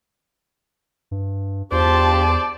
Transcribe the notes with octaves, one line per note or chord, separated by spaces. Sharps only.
G2
E2 D4 F4 G4 C5 D5 A5